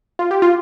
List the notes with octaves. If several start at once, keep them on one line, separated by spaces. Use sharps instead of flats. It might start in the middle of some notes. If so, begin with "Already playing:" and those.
F4
G4
F4